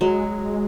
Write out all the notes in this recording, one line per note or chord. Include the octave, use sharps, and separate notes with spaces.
F#3 G#3